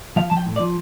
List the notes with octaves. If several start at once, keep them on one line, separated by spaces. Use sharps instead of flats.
F3 F5
F3 A5
G5
A2
D5
F3